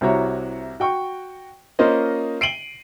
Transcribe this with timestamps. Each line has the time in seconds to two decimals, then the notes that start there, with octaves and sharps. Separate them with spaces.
0.01 C2 C3 E4 F#4 C#5 A#5
0.80 F#4 G5 C#6
1.79 A#3 C#4 F4 C5 D#5
2.41 C7 D7 D#7 F#7 G7